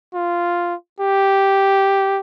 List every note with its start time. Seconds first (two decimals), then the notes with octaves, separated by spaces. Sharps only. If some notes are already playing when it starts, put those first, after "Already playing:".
0.14 F4
1.00 G4